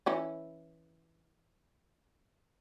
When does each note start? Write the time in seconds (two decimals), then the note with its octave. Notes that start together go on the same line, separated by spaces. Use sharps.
0.06 E3 C#4 E4